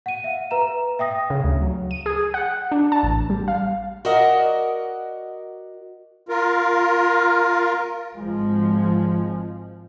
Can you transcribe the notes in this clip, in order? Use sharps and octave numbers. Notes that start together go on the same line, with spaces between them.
F#5 D#7
E5 F5
B4 E5 A#5 E7
E5 G5 D#6 A#6
C#3
D2
F#3
D#7
G#4
F#5
D4
A5
A1
G3
F5
F#4 A#4 D5 D#5 F#5
F4 A#4
G#1 F3 G#3